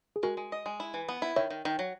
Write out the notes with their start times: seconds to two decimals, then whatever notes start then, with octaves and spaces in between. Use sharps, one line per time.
0.16 G#4
0.23 G#3 F#4 A#4
0.37 G#3
0.52 D#5
0.66 G#3
0.80 E4
0.94 E3
1.09 B3
1.22 E4
1.36 D#3 C#5 E5
1.50 D#3
1.65 D#3
1.79 F#3